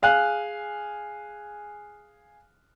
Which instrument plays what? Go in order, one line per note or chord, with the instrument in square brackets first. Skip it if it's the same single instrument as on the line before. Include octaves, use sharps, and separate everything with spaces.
[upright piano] G#4 F5 G#5 F#6